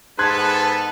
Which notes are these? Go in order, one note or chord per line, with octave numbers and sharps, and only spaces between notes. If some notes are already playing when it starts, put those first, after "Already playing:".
G#2 B3 A4 B4 A5 C6 F#6 G#6